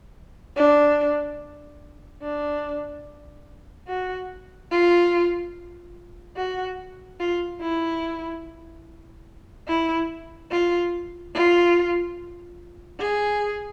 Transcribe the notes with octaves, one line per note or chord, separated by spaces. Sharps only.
D4
D4
F#4
F4
F#4
F4
E4
E4
F4
F4
G#4